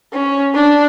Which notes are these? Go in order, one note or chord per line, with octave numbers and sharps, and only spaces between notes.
C#4
D4